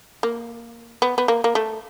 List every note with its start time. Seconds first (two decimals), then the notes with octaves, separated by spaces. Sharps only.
0.23 A#3
1.02 B3
1.18 B3
1.28 A#3
1.44 A#3
1.55 A3